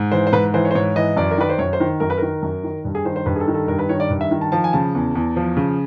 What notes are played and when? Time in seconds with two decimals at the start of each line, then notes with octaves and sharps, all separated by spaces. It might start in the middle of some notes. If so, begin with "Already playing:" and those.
Already playing: G#2
0.12 E3 C5
0.27 C5
0.32 G#2 B4
0.54 E3 C5
0.65 C#5
0.71 C5
0.75 G#2 C#5
0.96 E3 D#5
1.17 F#2 D5
1.31 A#4
1.38 D#3 B4
1.49 C5
1.59 F#2 C#5
1.73 C5
1.80 D#3
2.00 F#2 A#4
2.10 B4
2.17 D#3 A#4
2.43 F#2
2.64 D#3
2.85 G2
2.95 G#4
3.05 D#3 C5
3.16 C5
3.26 G2 B4
3.36 G#4
3.40 A4
3.48 D#3
3.54 A4
3.68 G2 A#4
3.79 B4
3.89 D#3 C#5
4.00 D5
4.10 G2
4.21 E5
4.31 D#3
4.41 A5
4.52 F3 A5
4.64 G#5
4.73 C#3 A5
4.95 E2
5.15 E2
5.36 F3
5.57 C#3